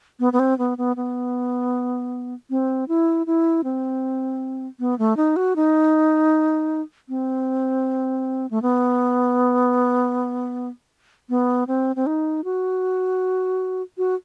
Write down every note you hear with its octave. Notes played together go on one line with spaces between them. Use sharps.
B3
B3
C4
B3
B3
B3
C4
E4
E4
C4
B3
A3
D#4
F#4
D#4
C4
A3
B3
B3
C4
C4
D#4
F#4
F#4